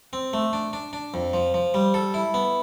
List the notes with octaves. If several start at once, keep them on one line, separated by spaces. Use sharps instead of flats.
C4
A3
D4
D4
D4
F2
F3
F3
G3
A4
E4
B3